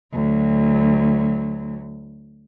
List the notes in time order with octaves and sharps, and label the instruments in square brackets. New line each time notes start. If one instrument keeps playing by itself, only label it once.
[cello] D2 F#3